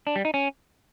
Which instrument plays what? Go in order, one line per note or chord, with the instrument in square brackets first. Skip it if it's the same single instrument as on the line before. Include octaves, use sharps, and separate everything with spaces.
[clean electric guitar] D4
G3
D#4
C#4